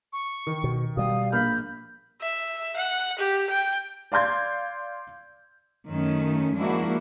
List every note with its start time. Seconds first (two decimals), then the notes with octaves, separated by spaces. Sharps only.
0.13 C#6
0.47 D#3
0.64 B2
0.97 B2 G3 F5 D#6
1.32 A#1 A#3 B5 F6 G6
2.21 E5
2.77 F#5
3.19 G4
3.50 G5
4.12 D5 F5 C6 G6 G#6
5.88 F#2 D#3 A3 C#4
6.55 F3 G#3 A#3 D4 E4 F#4